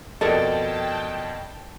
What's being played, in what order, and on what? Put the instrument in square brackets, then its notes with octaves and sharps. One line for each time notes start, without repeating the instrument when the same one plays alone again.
[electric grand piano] F2 B2 [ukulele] A4 A#4 D5 [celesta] D#5 [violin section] G5 A5